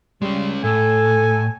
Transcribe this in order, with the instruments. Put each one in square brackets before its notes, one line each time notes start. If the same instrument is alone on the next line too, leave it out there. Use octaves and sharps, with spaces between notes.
[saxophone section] G3 [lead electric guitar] G#3 C#4
[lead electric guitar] A2 [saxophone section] A4 [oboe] G#5